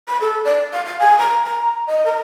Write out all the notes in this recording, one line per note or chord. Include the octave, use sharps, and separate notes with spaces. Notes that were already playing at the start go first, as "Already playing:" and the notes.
B5
A4
D5
F5
F5
G#5
A#5
A#5
D#5
A#4